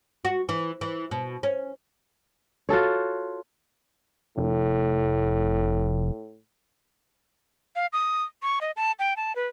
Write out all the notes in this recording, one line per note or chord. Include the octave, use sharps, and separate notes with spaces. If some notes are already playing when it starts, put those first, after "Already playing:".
F#4
E3
E3
B2
C#4
F4 F#4 A4 C#5
F1 A2
F5
D#6
C#6
D#5
A5
G5
A5
B4